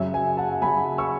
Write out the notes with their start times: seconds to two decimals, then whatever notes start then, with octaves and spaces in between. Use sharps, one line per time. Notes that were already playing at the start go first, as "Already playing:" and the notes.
Already playing: F#2 C#3 F#3 C#5 E5
0.14 E5 G#5
0.37 F#5 A5
0.62 F#2 C#3 F#3 G#5 B5
0.98 C#6 E6